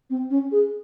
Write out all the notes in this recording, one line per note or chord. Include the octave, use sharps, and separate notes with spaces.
C4
C#4
G#4